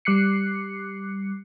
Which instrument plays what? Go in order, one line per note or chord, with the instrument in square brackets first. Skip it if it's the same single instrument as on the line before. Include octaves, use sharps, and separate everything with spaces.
[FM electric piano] G3 D6 F#6 C7 C#7